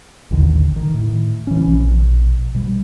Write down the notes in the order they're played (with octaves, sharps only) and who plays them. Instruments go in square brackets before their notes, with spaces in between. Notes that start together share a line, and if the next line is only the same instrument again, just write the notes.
[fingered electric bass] A1 D#2 D3 D#3
D#3
A2
E3 C#4
A#1 B2
B2 G3